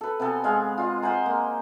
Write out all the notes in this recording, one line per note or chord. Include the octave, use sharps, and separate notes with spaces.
A4 B4
C3 B3 A4 G#5
G#3 F5
F4 D#5
C5 F#5 G#5 A#5
A#3